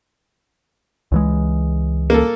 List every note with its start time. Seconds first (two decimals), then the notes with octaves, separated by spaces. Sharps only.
1.12 C#2 E3 G#3
2.10 A#3 A4